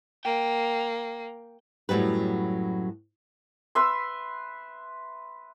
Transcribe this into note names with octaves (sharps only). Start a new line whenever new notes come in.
A#3 G5
F#2 A2 F#3 G3 B4
B4 E5 C6